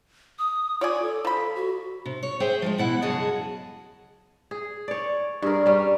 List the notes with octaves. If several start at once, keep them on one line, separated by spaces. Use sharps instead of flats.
D#6
F4 C#5 D5 G#5
A4
F3 B5
F#4
C3
C#5
G#4 C5 E5 G5
F3 G3 G#3
B2 E4 F#5
F#2 C#3 F#4 G#4 D#5 A5
G#4
C#5 D5
G2 G#4 A#4
G3 C#4